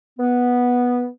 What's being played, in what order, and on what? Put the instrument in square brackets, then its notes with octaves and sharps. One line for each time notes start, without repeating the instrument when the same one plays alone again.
[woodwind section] B3